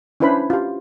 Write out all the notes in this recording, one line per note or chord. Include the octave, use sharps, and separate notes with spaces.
C#4 D4 E4 B4 C5 B5
F4 G4